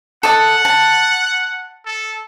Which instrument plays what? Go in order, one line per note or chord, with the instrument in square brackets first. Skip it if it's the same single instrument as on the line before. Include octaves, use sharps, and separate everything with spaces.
[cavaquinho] A4 D#5 A5 [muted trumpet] F#5
[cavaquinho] A5
[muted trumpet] A4